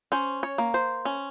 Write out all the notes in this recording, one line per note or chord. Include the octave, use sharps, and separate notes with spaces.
C#4 C5
C#5
A#3
C5
C#4